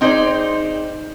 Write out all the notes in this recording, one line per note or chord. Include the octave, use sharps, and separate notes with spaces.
C4 D#4 G#4 C5 D5